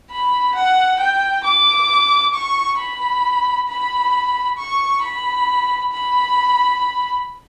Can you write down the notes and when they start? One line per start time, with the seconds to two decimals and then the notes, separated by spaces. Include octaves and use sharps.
0.11 B5
0.55 F#5
1.00 G5
1.44 D6
2.34 C#6
2.78 B5
3.69 B5
4.58 C#6
5.02 B5
5.92 B5